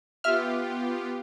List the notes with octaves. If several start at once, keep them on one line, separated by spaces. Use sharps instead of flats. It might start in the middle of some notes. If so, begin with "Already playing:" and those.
B3 F4 G4 E5 F6